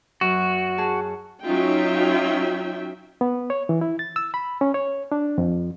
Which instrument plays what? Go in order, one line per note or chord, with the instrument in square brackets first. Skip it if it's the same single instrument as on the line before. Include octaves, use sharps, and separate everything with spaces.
[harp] F#2 [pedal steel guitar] F#4
[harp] G#4 A5
[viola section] F#3 C#4 D#4 F4 E5 G5
[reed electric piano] B3
C#5
E3
E4
A6
E6
B5
C#4
C#5
D4
F2